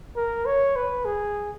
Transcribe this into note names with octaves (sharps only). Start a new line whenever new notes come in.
A#4
C#5
B4
G#4